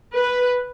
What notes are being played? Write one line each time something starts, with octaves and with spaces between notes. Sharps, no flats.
B4